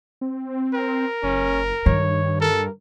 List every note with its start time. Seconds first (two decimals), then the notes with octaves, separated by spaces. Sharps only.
0.21 C4
0.74 A#4
1.23 F#1 C#4
1.86 G2 D#3 C#5
2.41 A4 A#4